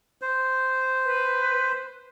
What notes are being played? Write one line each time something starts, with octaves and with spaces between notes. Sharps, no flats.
C5
B4